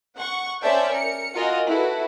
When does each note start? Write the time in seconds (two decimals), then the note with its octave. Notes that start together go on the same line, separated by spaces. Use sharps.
0.16 F#5 C#6
0.62 C#4 C5 D5 E5 G5 A5
0.91 A#4 C#7
1.35 F4 F#4 A#4 D#5 G#5
1.67 E4 F#4 A4 B4